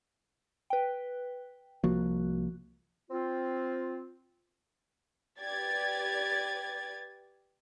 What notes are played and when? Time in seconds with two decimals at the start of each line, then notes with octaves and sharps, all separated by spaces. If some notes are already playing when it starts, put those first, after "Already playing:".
0.70 B4 G5
1.84 C2 F3 A#3 F#4
3.10 C4 F4
5.40 G4 B4 D5 G#6 A6